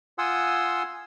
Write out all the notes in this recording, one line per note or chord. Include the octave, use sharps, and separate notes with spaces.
F4 F#5 G#5 C6 D#6 E6